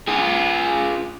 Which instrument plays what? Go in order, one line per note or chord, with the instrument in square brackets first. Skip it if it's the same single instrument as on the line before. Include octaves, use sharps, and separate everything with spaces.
[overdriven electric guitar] F4 G#4